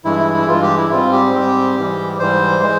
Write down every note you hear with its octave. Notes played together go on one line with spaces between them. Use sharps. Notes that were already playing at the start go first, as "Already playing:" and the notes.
G2 E3 G#3 E4
E4
E4
G2 E3 G#3 F4
G4
E4
G#2 G3 C4 F4
G4
G#2 G3 C4
G#2 E3 G3
G#2 E3 G3 C5
E3 G#3